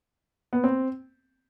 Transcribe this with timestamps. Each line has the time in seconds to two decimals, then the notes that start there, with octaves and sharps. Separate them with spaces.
0.53 B3
0.64 C4